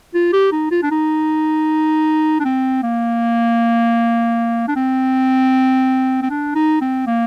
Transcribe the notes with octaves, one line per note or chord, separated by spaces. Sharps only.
F4
G4
D#4
F4
D4
D#4
D4
C4
A#3
D4
C4
C4
D4
D#4
C4
A#3